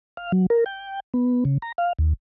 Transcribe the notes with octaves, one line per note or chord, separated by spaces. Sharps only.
F5
F#3
A#4
G5
B3
C#3
A#5
F5
D#2